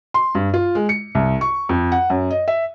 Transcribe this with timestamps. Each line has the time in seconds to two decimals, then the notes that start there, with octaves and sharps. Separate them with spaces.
0.14 C6
0.35 G2
0.54 F4
0.75 G#3
0.89 C#7
1.15 C2
1.41 C#6
1.69 F2
1.92 F#5
2.10 F#2
2.31 D#5
2.48 E5